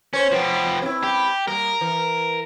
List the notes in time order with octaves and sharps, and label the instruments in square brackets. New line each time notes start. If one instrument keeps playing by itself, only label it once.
[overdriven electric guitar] C#4 [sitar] C5 C#5
[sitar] B2 [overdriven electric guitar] F3 G4
[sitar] C4 E4
[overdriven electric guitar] G4
[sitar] G3 A#3 [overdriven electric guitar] A#4
[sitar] E3